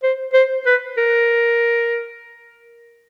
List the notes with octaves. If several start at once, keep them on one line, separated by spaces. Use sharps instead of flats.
C5
C5
B4
A#4